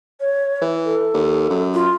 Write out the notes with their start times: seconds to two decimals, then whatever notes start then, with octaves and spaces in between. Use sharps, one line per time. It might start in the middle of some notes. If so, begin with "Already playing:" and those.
0.21 C#5
0.61 E3
0.85 A4
1.14 D#2
1.50 F#2
1.74 F4